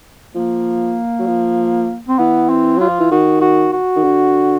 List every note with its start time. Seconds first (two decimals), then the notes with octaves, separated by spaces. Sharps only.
0.35 F3 A#3
1.19 F#3
1.27 F3
2.08 C4
2.19 E3 B3
2.49 C4
2.78 F#3 F4
2.89 F3
3.00 E3
3.11 D#3 F#4
3.41 F#4
3.73 F#4
3.96 D#3
4.04 D3